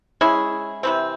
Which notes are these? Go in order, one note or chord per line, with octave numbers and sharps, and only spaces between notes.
G#3 C#4 E4 G#4
C3 E3 C4